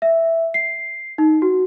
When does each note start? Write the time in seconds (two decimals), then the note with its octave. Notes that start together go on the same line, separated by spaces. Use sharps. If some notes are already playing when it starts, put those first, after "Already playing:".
0.02 E5
0.54 C7
1.18 D#4
1.42 F#4